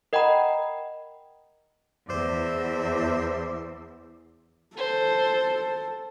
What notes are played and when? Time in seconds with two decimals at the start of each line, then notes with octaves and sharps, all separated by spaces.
0.13 A#4 D#5 F#5 G5 A#5 B5
2.08 E2 C5 D5 E5
4.77 A4 C5